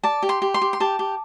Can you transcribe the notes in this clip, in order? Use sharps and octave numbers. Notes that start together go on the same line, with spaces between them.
D5 A5
G4
C6
G4
C6
G4
C6
G4 A5
G4